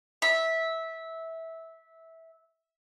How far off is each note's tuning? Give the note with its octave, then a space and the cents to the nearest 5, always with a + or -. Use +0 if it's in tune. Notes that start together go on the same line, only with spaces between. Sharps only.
E5 -15